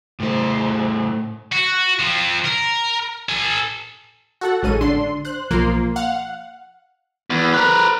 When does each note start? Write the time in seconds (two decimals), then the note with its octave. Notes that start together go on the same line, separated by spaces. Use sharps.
0.20 A2 C5
1.52 F#4
2.00 F3 C4
2.45 A#4
3.29 A4 G#5
4.41 F#4 A4 F#5
4.63 A1 G#3 C#4 A4 D#7
4.81 D3 D4 C6
5.25 C5 F#6
5.50 B1 F3 A#3 C6
5.96 F5 F#5
7.30 E2
7.54 A#4 B4